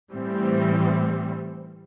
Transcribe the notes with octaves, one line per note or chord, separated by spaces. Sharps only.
A2 E3 G3 C4